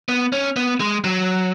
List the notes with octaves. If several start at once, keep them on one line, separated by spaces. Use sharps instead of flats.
B3
C#4
B3
G#3
F#3